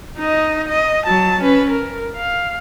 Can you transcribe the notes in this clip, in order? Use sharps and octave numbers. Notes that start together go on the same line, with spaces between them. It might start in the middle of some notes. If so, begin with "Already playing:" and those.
D#4 D#5
D#5
F#3 A5
C#4 B4
A#4
F5